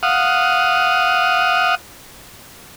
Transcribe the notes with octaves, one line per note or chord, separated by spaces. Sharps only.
F5 F#5 D#6